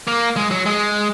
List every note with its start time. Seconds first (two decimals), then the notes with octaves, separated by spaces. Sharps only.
0.08 A#3
0.37 G#3
0.51 F#3
0.66 G#3